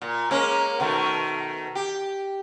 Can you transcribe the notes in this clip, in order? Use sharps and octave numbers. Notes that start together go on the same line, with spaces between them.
A#2
G#3 A#3 C#4
B2 D#3 A3
G4